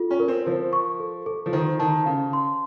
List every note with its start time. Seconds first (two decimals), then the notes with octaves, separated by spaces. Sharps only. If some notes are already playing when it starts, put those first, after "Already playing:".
Already playing: F4 A4
0.11 C#4
0.20 A#4
0.28 C4
0.46 F3 C5
0.73 C#6
1.00 A4
1.26 A4
1.46 F3
1.53 D#3 C5
1.79 D#3 A5
2.06 C#3 F5
2.33 C6